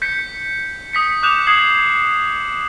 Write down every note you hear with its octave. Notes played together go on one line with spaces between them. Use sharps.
G6 B6 C#7
D#6 B6 C#7
D6 D#6 F#6 G6 E7 F7
D#6 G#6 B6 C7 F#7